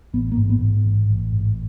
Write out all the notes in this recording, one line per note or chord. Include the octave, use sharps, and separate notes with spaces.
A1 B3
A#3
G#2
B3
G#2
A1
A1
G#2